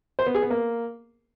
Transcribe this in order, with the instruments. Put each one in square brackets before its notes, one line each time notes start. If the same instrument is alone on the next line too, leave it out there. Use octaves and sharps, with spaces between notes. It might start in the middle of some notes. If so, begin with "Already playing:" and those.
[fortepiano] C5
B3
G#4
B3
A#3